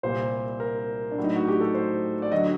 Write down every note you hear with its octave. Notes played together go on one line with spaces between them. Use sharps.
C2 A#2 G3 C5
A#4
D4
A2 F#3
D#4
F#4
G4
A4
C5
D5
D3 F#3 D#5